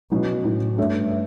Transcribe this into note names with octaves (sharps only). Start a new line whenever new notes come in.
B2 F#3 C#4 E4
A2 F#3 C#4 E4
G2 A3 D4 A4 C#5 E5
E5